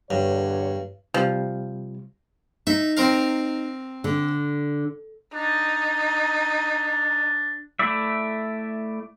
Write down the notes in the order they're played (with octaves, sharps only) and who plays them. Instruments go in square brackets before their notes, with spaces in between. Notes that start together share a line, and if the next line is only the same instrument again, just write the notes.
[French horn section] E2 D3 C#5 [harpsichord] G2
[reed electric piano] C3 G3 [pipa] F3
[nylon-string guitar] D#4 [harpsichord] E5
[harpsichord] C4 A#4 F5
[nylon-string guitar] D3
[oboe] D4 [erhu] D#4
[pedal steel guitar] A3 E4 D5 E5